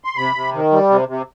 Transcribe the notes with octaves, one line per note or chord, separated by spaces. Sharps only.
C6
C3 B5
C3
D#3
G3
C3
C3